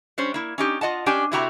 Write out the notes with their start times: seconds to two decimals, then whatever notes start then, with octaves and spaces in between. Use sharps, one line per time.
0.18 G3 C#4 C5
0.34 A#3 E4
0.58 C#4 D#4 G4
0.81 F4 D#5 F#5 A5
1.06 C#4 D4 G4 G5 G#5
1.32 C3 A3 E4 F#4 G5 A#5